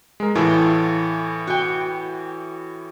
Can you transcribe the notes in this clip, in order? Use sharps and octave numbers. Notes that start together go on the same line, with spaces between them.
G#3 A#4
A2 E3 A3 F4
F#4 G5